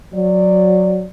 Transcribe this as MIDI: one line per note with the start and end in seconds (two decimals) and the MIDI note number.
0.13 1.06 54
0.13 1.06 74